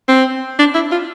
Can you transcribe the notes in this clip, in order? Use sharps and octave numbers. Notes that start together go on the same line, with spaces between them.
C4
D4
E4
F4